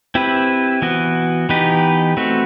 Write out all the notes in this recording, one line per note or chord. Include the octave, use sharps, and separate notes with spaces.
C4 E4 G4 B4
E3 B3 F#4
E3 B3 D#4 G4 B4
A3 C4 F#4 B4